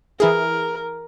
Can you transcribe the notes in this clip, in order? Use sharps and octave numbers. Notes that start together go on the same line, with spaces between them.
E3 E4 G#4 A#4